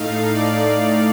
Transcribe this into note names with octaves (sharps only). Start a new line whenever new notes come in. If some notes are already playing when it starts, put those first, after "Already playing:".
Already playing: A2 A3 D#4 F5
D5